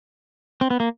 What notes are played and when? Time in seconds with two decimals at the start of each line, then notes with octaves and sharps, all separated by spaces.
0.61 C4
0.70 B3
0.80 A#3